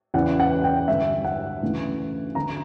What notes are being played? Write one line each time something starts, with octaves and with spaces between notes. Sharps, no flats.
E2 C#3 E3 F#5
F#5
G5
G2 D3 E5
F#5
D2 C#3 E3
D3 A#5